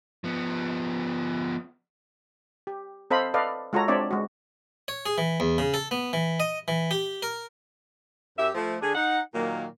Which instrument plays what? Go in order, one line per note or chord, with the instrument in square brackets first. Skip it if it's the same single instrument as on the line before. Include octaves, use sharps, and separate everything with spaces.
[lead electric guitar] F3 B3
[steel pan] G4
C4 A4 C5 D#5 F5 B5
A4 B4 D5 D#5 F5
G#3 F4 F#4 A4 C#5 A#5
G#3 C4 D4 C#5 D5 E5
G#3 F#4
[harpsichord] C#5
G#4
E3
E2
C#3
A4
B3
E3
D#5
E3
G4
A#4
[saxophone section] F#2 G4 E5
F3 A3
D3 D4 G#4
D#4 F#5
A#2 D#3 F#3 A#3